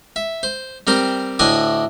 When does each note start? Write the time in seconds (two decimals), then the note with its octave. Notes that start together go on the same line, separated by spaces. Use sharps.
0.16 E5
0.43 C5
0.87 G3 C4 A#4 C5
1.39 D2 A2 D4 D#5 G#5 D#6